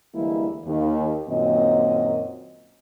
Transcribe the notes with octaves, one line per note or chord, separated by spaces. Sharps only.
D2 E3 G3 G#3 A#3 E4
D#2
F#2 A#2 D#3 A#3 C4 D#5